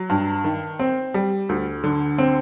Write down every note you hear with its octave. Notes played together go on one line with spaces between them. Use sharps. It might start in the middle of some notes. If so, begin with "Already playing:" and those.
Already playing: F#3
G2
D#3
C4
G3
D2
D3
C4